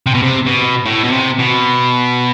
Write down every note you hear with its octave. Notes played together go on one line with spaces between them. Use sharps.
C3
B2
C3
B2
A2
B2
C3
B2